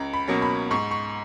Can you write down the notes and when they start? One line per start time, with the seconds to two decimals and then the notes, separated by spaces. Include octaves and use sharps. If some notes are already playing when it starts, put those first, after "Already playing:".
Already playing: C#2 A#5
0.13 B5
0.28 B2 F#3 A#3 C#4
0.42 B5
0.71 G#2 C#6
0.91 C#6